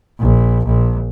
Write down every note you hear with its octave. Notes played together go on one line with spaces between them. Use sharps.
A#1
A#1